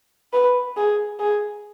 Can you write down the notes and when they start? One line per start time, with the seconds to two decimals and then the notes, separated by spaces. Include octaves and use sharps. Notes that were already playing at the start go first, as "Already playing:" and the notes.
0.33 B4
0.77 G#4
1.20 G#4